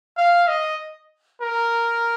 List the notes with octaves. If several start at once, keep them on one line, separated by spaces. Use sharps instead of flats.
F5
D#5
A#4